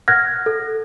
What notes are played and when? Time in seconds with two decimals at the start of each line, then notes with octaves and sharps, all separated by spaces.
0.08 F#5 F6 F#6 G#6 A#6
0.46 A4